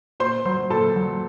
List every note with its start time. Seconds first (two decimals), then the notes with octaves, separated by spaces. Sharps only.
0.20 A#2 C5 C6
0.45 F#3 C5 C6
0.70 A#2 A4 A5
0.96 F#3